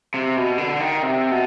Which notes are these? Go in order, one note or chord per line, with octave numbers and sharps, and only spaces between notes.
C3
B2
D3
D#3
C3
B2